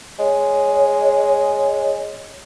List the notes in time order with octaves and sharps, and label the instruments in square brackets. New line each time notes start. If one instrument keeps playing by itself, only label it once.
[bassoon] G#3 [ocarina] C#5